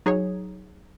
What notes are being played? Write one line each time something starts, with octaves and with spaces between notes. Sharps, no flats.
F#3 D#4 G#4 C#5